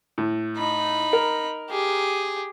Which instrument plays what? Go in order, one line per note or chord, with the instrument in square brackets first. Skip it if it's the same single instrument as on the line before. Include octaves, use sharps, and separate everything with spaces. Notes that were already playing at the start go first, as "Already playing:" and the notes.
[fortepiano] A2
[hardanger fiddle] D#4 B5
[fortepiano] A#4
[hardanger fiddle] G4 G#4